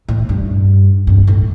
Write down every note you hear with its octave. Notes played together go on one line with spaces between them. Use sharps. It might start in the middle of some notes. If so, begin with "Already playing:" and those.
A2
G2
G2
A2